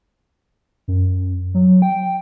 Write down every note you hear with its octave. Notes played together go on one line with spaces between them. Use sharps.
F#2
F#3
G5